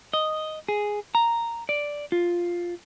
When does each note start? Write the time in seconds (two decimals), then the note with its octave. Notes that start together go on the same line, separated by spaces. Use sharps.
0.13 D#5
0.68 G#4
1.15 A#5
1.69 D5
2.12 F4